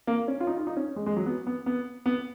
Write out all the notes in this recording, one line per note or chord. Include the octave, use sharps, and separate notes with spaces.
A#3
C#4
F4
D#4
F4
D#4
C#4
G#3
G#3
F#3
B3
B3
B3
B3